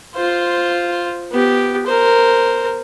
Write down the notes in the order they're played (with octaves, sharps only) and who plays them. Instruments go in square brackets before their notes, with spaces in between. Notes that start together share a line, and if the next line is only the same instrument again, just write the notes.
[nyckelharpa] F4 C5
B3 G4
A#4 C5